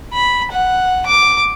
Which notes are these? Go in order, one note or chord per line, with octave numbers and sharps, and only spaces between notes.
B5
F#5
D6